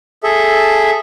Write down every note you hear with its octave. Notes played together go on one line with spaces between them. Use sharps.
G#4 A4 E5